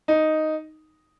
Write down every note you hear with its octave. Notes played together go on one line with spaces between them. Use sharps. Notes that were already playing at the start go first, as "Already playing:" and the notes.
D#4